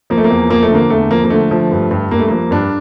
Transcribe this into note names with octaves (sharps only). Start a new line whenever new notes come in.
F3 A#3
A3
A#3
E2
F3 A#3
A3
D3 A#3
E2 A3
F3 A#3
A#3
D3 A3
F3
G2
G2
G2 A#3
A3
F3 A#3
G2 D4